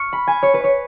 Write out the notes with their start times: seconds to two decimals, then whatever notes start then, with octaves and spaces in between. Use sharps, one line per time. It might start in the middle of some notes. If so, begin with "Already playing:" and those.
Already playing: C#6 F6
0.13 B5
0.27 G#5
0.43 C#5
0.54 B4
0.64 C#5